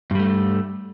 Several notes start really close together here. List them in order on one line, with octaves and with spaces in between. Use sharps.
G2 G3 A3